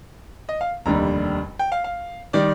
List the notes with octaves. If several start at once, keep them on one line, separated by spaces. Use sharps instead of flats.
D#5
F5
F1 D#2 D3 G3 A#5
G5
F5
F5
D#3 G3 D5